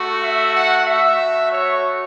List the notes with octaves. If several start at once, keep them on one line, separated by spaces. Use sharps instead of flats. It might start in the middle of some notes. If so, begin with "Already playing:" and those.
Already playing: A3 F#4
E5
F#5
A3 F#4 E5
C#5